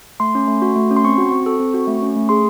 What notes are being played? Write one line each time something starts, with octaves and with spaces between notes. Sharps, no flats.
A3 C6
C#4
A3
F#4
A3
C#4
C6
C4 C#6
F#4
C4
A4
C4
F#4
A3
C#4
A3
G#4 C6